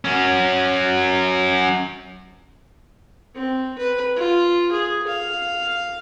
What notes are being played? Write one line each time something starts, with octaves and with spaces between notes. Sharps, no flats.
F#3 C#4
C4
B4
F4
G#4
F5